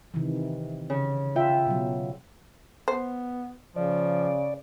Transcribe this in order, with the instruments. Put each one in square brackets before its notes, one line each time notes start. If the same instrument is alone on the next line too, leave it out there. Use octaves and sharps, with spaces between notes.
[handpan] C3 D#3 E3
[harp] C#3
[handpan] F4 E5 [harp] G5
[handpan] B2 F#3
[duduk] B3 [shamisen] C5
[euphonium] C#3 [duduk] F3 [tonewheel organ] D5